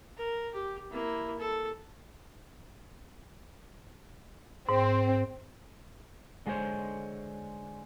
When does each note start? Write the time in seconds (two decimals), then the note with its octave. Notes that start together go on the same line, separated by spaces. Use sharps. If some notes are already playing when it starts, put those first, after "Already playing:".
0.17 A#4
0.54 G4
0.91 A#3 E4
1.39 A4
4.69 G#2 C4
6.46 D3 G#3 F4 F#4 C5 C#5